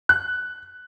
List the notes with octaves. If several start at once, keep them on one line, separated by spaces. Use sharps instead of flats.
F#6